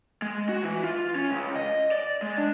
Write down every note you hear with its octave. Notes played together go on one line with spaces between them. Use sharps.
G#3
F#4
E3
F4
C#4
C#2
D#5
D5
G#3
D4